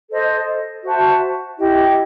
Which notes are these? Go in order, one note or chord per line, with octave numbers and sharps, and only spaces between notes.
A4 C5 D#5
F#4 C5 E5 A5
E4 G4 D#5